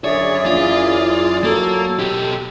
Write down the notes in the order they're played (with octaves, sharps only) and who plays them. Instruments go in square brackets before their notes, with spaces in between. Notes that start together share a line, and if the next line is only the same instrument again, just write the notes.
[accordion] F#2 G#4 D5 [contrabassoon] D3 [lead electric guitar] C#5 [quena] E5
[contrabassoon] A#1 [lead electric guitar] F4
[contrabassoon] E3
[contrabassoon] F#3 [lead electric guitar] A#3 [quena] A4
[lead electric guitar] B2 G4